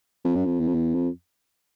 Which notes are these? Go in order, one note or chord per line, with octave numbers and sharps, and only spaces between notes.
F2
F#2
F2
E2
F2
E2
F2